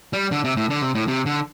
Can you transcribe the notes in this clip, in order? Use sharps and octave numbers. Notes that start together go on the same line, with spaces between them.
G3
D3
C3
A2
D3
C3
A2
C3
D3